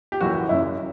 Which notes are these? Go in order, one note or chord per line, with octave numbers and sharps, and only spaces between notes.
G4
F#1 F#2 E3 F#4
F#1 F#2 C#3 E4